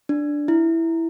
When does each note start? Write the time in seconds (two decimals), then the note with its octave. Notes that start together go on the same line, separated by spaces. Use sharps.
0.09 D4
0.48 E4